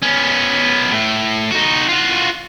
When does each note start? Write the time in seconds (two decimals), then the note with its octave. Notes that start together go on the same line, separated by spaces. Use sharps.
0.02 B3 C#4
0.91 A2
1.51 D#4 F#4
1.89 F4 F#4